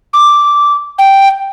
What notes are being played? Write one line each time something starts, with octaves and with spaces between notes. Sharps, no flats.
D6
G5